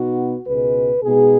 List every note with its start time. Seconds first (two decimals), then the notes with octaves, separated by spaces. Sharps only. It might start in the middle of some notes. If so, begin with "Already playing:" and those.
Already playing: B2 B3 D#4 F#4
0.46 C#2 B2 G#3 B4
1.03 B2 G#3 B3 D#4 G#4